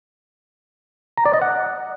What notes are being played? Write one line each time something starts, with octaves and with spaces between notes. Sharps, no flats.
A#5
D5
D#5
F#5